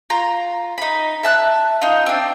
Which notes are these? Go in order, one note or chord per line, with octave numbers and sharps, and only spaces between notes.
F4 A#5
D#4 B5
E5 A5 F#6
D#4 F4
C4 D4